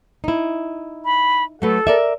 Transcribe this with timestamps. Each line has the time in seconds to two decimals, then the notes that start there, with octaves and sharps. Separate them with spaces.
0.24 D#4 E4
1.05 B5
1.62 F#3 A3 A4 B4
1.87 A#4 D5 E5